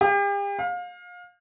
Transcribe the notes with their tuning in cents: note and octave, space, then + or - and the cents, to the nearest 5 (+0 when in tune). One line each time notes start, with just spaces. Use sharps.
G4 +40
F5 +30